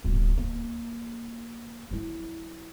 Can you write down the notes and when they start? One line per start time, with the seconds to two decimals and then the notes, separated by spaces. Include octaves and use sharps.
0.04 D1 G1
0.38 A#3
1.91 F#3 E4